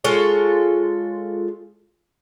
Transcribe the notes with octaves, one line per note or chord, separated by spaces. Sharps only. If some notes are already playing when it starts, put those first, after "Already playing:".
G#3 F4 A4 C#5